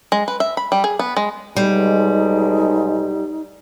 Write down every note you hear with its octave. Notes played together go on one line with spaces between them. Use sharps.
G#3
B4
E5
B5
G3
G#4
B3
G#3
B1 G3 G#3 D#4